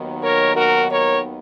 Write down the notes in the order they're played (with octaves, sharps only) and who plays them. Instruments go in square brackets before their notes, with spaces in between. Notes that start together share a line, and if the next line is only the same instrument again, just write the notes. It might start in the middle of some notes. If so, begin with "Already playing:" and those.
Already playing: [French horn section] D#2 D#3 F#3 B3
A#4 C#5
F#4 A#4
A#4 C#5